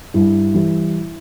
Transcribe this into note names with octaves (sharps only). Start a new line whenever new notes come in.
G2 E4
E3 G3